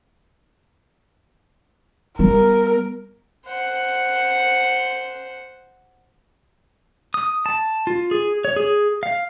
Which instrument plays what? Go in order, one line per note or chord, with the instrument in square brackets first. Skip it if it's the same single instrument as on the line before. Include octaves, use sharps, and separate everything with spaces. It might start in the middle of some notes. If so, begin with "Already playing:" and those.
[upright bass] G3 B3 [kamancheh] A#4
[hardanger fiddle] C5 F#5
[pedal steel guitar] D#6
A5
F4
G#4
C#5
G#4
F5